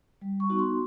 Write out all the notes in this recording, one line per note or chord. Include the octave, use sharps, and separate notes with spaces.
G3
C#6
B3 D#4 F#4
C6